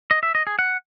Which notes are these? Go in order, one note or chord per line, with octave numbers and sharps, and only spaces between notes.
D#5
E5
D#5
G#4
F#5